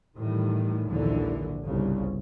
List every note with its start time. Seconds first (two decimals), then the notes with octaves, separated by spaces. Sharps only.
0.18 A2 D#3 E3 G3
0.87 A#1 D#2 G#2 D3 E3 F#3
1.65 G1 C2 C#3